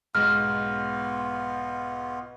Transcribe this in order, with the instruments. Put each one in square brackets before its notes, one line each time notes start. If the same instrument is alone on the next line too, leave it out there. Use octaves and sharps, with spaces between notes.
[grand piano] B1 G#2 [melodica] B3 F4 [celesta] F6